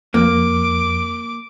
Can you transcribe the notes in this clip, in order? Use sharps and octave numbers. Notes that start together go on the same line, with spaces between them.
F2 A#3 D6